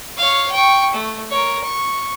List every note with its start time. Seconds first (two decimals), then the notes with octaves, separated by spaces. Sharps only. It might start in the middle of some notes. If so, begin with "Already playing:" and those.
0.17 C#5 F5
0.51 G5 C#6
0.93 A3
1.30 A#4 C#5
1.64 C#6